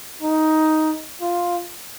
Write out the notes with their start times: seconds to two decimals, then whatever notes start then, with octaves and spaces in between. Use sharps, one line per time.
0.22 D#4
1.21 F4